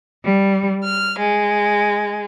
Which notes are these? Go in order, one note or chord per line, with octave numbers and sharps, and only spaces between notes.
G3
F6
G#3